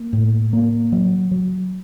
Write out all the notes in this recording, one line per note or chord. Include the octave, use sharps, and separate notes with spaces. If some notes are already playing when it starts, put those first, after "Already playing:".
Already playing: A#3
A2
A#3
F#3
F#3